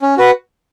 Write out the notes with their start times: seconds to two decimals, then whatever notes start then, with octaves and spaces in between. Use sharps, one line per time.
0.02 C#4
0.18 F#4 B4 F#5